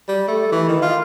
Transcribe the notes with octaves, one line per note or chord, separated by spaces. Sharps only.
G3
A3
E3
D#3
F4